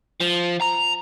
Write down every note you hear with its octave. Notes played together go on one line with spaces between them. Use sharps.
F3
A#5